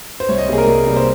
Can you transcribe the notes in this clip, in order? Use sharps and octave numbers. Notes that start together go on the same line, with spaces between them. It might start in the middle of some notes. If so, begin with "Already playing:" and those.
C5
C2 C#5
D#5
C3 G3 A#3 G#4
A#4
C2
C3 G3 A#3
C5